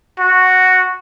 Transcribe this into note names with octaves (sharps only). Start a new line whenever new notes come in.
F#4